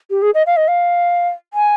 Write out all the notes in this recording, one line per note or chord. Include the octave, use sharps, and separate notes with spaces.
G4
G#4
D#5
F5
D#5
F5
G#5